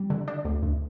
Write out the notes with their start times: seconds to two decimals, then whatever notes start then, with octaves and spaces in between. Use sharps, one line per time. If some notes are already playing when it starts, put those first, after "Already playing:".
Already playing: G3
0.10 D3
0.28 D4
0.45 D2
0.63 D2